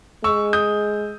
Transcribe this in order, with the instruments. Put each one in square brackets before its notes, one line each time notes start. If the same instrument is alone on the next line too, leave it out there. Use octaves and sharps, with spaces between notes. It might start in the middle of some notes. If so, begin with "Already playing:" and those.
[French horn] G#3 [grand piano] C#6 E6
[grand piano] D#6 G6